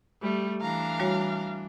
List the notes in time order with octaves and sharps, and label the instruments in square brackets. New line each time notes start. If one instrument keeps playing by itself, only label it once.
[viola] G3 [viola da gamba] A3
[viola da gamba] E3 D4 [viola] F5 A#5
[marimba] G3 F#4 C#5